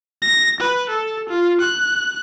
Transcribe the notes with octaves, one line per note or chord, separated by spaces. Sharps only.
A#6
B4
A4
F4
F#6